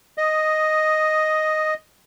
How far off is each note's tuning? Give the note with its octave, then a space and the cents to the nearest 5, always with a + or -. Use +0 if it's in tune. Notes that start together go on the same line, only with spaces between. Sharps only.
D#5 +0 D#6 +10